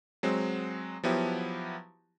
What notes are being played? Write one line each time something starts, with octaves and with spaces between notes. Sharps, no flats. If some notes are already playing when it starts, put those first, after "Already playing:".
F#3 G#3 C4
F3 F#3 B3 E4 G4